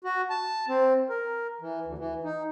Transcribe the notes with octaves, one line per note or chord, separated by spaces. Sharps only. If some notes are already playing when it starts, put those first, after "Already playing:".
F#4
A5
C4
A#4
E3
D2
E3
D#4